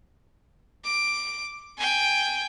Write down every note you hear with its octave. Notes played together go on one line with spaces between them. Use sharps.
D6
G5 G#5